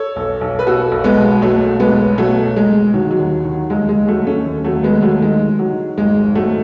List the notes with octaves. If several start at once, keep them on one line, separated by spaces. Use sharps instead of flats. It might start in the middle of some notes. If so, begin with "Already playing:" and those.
Already playing: A4 C#5
B1
B1
B4
B2 F#4 A4
B1
G#3 B3
B2
B1 F#3 A3
B2
G#3 B3
B1
B2 F#3 A3
B1
G#3
B1
D#3 F#3
F#3
D#2
D#3
D#2 G#3
G#3
D#2
F#3 A3
D#2
A3 C#4
D#2
F#3 A3
D#2
G#3 B3
D#2
F#3 A3
D#3 G#3
D#3
F#3
D#3
G#1 G#3
G#1
F#3 A3